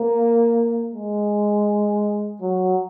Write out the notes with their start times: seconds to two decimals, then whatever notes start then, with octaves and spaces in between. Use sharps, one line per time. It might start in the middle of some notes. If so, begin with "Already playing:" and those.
Already playing: A#3
0.95 G#3
2.41 F#3